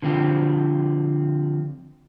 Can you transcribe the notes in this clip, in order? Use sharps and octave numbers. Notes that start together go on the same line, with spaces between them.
D3 F3 C4 G4